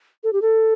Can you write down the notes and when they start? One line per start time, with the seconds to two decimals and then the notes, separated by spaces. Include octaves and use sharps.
0.23 A4
0.33 G4
0.42 A4